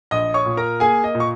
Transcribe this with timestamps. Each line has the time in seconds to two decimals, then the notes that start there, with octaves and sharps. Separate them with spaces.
0.11 A#1 D#5 D#6
0.34 C#5 C#6
0.46 A#2
0.57 A#4 A#5
0.80 A#3 G#4 G#5
1.04 D#5
1.15 A#2
1.20 C#6